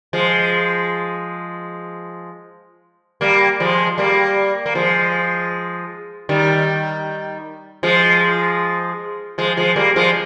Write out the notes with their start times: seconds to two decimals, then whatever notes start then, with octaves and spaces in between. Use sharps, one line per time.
0.13 F3 G#3
3.21 G3 A#3
3.60 F3 G#3
3.98 G3 A#3
4.66 A#3
4.75 F3 G#3
6.29 D#3 G3
7.83 F3 G#3
9.38 F3 G#3
9.57 F3 G#3
9.76 G3 A#3
9.96 F3 G#3